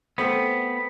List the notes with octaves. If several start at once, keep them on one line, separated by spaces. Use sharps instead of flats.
A3 B3 C4